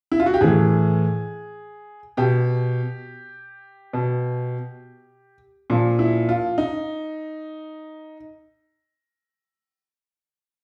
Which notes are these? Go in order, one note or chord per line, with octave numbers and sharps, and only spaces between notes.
E4
F4
F#4
G4
A2 E3 G#4
B2 G4
B2
A#2 F3
E4
F4
D#4